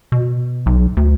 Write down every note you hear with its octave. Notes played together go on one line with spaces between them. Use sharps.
B2
B1
D2